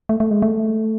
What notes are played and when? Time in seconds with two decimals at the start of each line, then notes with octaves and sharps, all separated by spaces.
0.09 A3
0.20 A3
0.31 G#3
0.42 A3